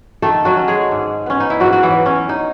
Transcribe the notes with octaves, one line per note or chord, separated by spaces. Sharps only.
D#3 A3 A4
F#3 F#4
C#4
G#3 G#4
G#2
B3 C#4
D#4
E4
G#2 F#3 F#4
F#4
E3 E4
F#3
C#4
D#4